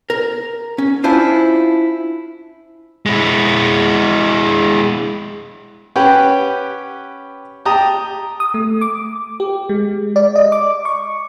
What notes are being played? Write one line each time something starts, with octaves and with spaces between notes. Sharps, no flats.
A#4
C#4
C#4 D4 E4 F4 C5
G#3 E4
C#4 G4 B4 F#5 G5
G4 A5 A#5 D#6
D#6
A3
D6
G4
G#3
D5
D#5
D6
C#6